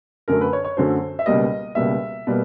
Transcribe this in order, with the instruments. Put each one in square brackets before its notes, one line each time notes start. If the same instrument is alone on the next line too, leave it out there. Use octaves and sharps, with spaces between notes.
[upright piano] F#2 D3 F#3 A3 A#4
B4
C#5
C#5
F#2 D3 F#3 A3 C5
E5
C#2 B2 G3 A#3 D#5
C#2 B2 G3 A#3 E5
B2 G3 A#3